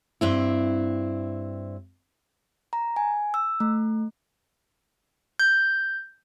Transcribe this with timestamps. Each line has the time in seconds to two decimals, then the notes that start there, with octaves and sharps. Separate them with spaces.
0.21 G2 C4 E4
2.73 A#5
2.96 G#5
3.34 E6
3.60 A3
5.40 G6